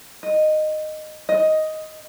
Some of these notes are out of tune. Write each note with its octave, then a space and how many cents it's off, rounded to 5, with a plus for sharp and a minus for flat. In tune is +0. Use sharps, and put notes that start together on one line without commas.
D#5 -15
D#5 +5